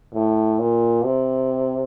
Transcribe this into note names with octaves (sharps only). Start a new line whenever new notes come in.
A2
A#2
C3